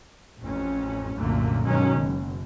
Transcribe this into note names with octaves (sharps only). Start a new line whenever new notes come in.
A1 F2 C#4
C2 F#2 A#2 D3 A3 A#3
G2 B2 D#3 F#3 G#3 C#4
F#1